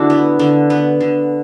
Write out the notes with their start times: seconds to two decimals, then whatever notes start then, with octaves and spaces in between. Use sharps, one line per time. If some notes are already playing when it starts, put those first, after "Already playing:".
Already playing: D3 D4 E4 F#4 A4
0.10 B3
0.39 D3
0.70 B3
1.00 D3